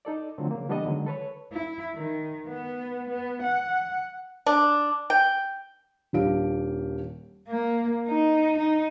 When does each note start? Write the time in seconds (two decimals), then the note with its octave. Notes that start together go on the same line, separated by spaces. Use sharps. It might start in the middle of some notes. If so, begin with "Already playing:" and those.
0.05 D#4 A4 D5
0.38 D3 F3 F#3 A3 C4
0.51 C#3 A#3
0.69 E3 G3 B3 D4 A4 D#5
0.85 D3 D#3 F#3 G#3
1.06 A4 B4 C#5
1.52 E4
1.95 D#3
2.48 B3
3.09 B3
3.43 F#5
4.46 D4
5.10 G5
6.13 D#1 D4 G4 F5 D7
7.48 A#3
8.08 D#4
8.58 D#4